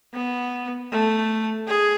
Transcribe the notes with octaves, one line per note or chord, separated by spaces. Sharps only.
B3
A3
G#4